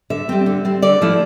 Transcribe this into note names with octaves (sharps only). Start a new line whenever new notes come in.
D3 E5
G3 C4
D3
G3 C4
D3 D5
F3 A3 E4